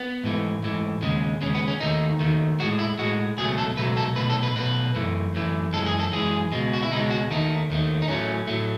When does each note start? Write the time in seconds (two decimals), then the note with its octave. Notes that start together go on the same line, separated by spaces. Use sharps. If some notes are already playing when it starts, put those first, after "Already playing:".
Already playing: B3
0.24 G#2 E3 A3
0.63 G#2 E3 A3
1.02 D#2 C#3 G#3
1.41 D#2 C#3 G#3 C#4
1.55 B3
1.68 C#4
1.80 D#2 D#3 A3 D#4
2.20 D#2 D#3 A3
2.60 A2 G#3 F#4
2.79 E4
2.99 A2 G#3 F#4
3.37 C#2 B2 F#3 A3 G#4
3.58 A4
3.77 C#2 B2 F#3 A3 B4
3.97 A4
4.16 B1 B2 A3 B4
4.30 A4
4.43 B4
4.55 B1 B2 A3 B4
4.95 F#2 E3 A3
5.34 F#2 E3 A3
5.73 F#2 E3 G#3 A4
5.86 G#4
6.00 A4
6.12 F#2 E3 G#3 G#4
6.52 C#2 B2 G#3
6.73 F#4
6.83 E4
6.91 C#2 B2 G#3 D#4
7.10 F#4
7.30 D#2 D#3 A3 D#4
7.70 D#2 D#3 A3
8.02 D#4
8.08 A2 F#3 A3 C#4
8.47 A2 F#3 A3